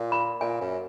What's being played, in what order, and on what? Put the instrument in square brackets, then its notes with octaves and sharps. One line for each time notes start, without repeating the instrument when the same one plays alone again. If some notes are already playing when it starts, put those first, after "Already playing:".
Already playing: [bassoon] A#2
[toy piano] B5
[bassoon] A#2 [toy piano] G#5
[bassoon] F#2